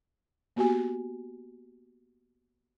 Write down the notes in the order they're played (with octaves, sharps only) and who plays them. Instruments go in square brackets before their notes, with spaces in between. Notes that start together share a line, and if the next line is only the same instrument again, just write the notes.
[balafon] A#3 B3 F#4 G4 G#5